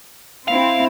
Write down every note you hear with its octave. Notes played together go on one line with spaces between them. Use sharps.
C4 E4 F5